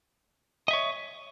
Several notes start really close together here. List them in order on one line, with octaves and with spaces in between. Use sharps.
D#5 E5 C#5